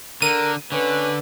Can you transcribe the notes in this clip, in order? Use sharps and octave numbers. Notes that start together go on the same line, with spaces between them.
D3 A#4 D#7
D3 C#4 B4